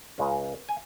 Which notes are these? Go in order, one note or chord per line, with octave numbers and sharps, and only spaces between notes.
C#2 C#3 G#3 C#4
G#5